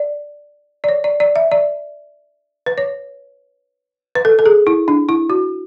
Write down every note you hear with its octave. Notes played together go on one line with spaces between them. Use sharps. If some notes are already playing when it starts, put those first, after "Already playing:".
Already playing: D5
D5
C#5
D5
D5
E5
D5
B4
C#5
B4
A4
A4
G#4
E4
D4
E4
F#4